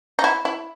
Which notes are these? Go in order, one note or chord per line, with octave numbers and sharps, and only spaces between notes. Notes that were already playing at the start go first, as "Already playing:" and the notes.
D#4
E4
E4